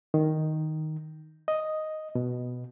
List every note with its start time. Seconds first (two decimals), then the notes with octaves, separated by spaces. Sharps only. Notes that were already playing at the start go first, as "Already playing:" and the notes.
0.14 D#3
1.48 D#5
2.15 B2